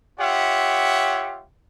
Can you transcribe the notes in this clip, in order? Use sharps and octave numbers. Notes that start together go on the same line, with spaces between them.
F4 G4 C#5 E5 F#5